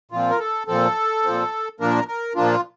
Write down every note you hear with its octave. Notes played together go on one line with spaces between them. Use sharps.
A#2 F3 C4 F4
A#4
A4
A#2 F3 C4 A4
A#2 F3 C4
A#2 F3 A#3 D4 A#4
A#4
A#2 F3 A#3 D4 F4